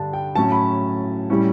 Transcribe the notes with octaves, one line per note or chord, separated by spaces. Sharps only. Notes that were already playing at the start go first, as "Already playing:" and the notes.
Already playing: G2 D3 G3 D4 A5
G5
A2 F#3 C#4 A5
B5
A2 G3 C#4 E4